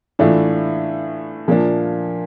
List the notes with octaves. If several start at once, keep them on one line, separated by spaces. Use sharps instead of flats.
A2 E3 A3 D4 F4
A#2 F3 A#3 D4 F4